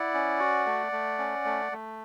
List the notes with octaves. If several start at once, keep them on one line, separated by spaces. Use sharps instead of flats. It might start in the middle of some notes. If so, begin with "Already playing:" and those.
Already playing: E4 D5 F#5
C#4
F#4
A3
A3
C#4
A3
A3